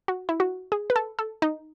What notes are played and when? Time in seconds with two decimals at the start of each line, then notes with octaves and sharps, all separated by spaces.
0.08 F#4
0.29 E4
0.40 F#4
0.72 G#4
0.90 B4
0.96 A4
1.19 A4
1.42 D#4